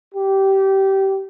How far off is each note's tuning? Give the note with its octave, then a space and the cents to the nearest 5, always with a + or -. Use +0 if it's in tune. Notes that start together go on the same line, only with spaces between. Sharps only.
G4 -20